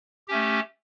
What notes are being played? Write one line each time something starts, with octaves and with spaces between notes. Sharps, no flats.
A3 C#4 G4